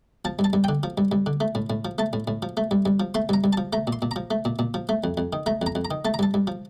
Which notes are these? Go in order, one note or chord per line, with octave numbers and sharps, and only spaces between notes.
F3 A5
G2
A5
G2
D3 G5
F3
G2
G2
D3
A3
A2
A2
F3
A3 A5
A2
A2
F3
A3
G2
G2
F3
A3 C6
G2 A#5
G2
F3 A5
A3 A#5
A#2
C6
A#2
F3 A#5
A3
A#2
A#2
F3
A3
F2
F2
D#3
A3 A#5
F2
A#5
F2
A#5
D#3
A3 A5
A#5
G2 A5
G2
F3